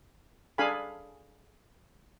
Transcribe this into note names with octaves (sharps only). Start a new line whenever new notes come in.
D4 G#4 A4 F5 G#5 B5